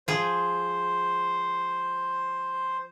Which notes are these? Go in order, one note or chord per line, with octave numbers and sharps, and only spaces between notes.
F3 G#4 C5